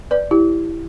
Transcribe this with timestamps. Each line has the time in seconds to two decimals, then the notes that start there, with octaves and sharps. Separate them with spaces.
0.11 B4 D5
0.31 E4 G4